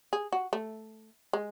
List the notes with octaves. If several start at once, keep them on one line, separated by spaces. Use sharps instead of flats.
G#4
F#4
A3
G#3